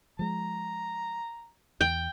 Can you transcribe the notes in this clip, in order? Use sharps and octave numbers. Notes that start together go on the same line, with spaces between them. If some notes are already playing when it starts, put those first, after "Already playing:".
F3 G#3 A#5
E2 G5